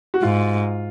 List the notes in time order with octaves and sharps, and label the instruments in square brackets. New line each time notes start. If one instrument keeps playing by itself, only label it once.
[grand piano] F#4
[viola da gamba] G#2 [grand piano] F4